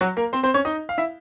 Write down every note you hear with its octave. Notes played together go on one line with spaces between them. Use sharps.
F#3 F#4
A#3 A#4
C4 C5
C4 C5
C#4 C#5
D#4 D#5
F5
E4 E5